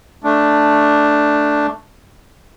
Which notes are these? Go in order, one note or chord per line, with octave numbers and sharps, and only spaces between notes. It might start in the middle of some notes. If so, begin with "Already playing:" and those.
A3 D4